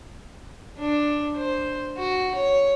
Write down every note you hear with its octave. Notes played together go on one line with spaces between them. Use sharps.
D4
C5
F#4
C#5